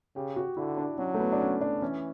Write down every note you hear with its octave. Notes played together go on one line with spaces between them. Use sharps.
C#3 G4
F#4
D3 E4
D4
F#3 C#4
A3
B3
D4
C#4
D4
E3 C#4